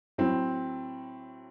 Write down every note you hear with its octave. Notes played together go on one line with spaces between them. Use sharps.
A2 F#3 C4